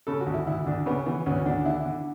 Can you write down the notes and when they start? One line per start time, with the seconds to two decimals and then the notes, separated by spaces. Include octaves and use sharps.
0.07 C#3 A4
0.21 F#4
0.27 D2
0.34 E4
0.47 D2 E4
0.66 D2 D4
0.86 C#3 B3
1.06 E3 B3
1.26 D2 C#4
1.46 D2 D4
1.66 D3 E4
1.86 D3